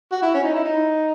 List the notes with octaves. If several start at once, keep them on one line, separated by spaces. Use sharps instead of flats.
F#4
E4
C#4
D#4
E4
D#4